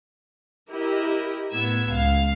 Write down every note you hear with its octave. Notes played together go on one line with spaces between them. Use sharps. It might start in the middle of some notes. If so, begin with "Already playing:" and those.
E4 G4 A#4 D#5
A2 B3 E6 G#6
C#2 F5